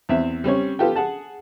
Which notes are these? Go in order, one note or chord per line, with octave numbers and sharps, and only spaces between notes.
E2 C4 E5
G3 C4 C#4 C#5
B3 F4 G4 A4 G5
G#4 F#5 A5